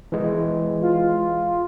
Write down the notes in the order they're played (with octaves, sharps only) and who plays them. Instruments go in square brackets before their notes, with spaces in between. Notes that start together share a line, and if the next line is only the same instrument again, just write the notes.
[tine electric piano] E3 G#3
[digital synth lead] F4